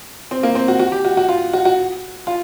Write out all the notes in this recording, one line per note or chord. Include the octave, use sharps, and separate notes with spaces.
C4
A#3
C4
F#4
F#4
G4
F#4
F#4
F4
F#4
F#4
F4